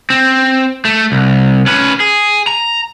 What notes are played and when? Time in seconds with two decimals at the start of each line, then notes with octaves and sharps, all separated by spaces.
0.10 C4
0.85 A3
1.12 C2
1.66 C#4 B4
2.00 G#4
2.47 A#5